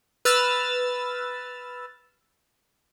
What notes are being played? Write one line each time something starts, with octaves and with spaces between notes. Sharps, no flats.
B4 E6 F6 A6